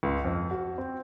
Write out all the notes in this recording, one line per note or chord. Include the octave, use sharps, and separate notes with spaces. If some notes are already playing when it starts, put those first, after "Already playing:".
C#2
F2
F#4
C4